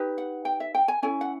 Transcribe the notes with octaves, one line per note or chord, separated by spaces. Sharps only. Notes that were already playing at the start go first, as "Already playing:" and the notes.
Already playing: D#4 G4 B4
F#5
G5
E5
G5
G#5
C#4 E4 A4 G#5
F#5